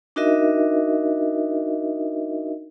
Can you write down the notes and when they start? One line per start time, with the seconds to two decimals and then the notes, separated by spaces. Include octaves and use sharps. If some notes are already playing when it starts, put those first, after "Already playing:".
0.16 D4 D#4 F#4 A#4 D#5 E5